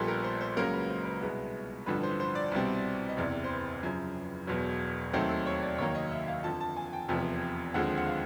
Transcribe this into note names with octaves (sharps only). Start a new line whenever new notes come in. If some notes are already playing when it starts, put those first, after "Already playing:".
Already playing: A#1 A#2 G3 B3 A4
A#4
C5
C5
C#2 C#3 F#3 A#3 A#4
B4
C5
B4
C2 B2 G#3 B3
A1 G2 D3 F3 B4
C5
C5
D5
C2 B2 G3 C4
D#5
F#1 E2 C3 E3 D5
C5
B4
F#2 C#3 F3
E1 E2 B2 F#3
D#2 D#3 F#3 A3 C4 A4
A4
C#5
D5
F1 D#2 D#3 F#3 A#3 C#5
D#5
E5
F5
F2 D3 F3 A5
A5
G#5
G5
F1 E2 C3 F3
D#2 D3 F3 G#3 C4 F#5
F#5
F5